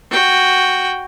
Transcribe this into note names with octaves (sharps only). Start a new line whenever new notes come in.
F#4 G5